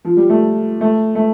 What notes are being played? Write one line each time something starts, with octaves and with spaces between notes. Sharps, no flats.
F3
G3
A3
A3
A3